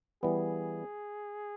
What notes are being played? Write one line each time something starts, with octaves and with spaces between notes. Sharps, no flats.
E3 G3 B3 G#4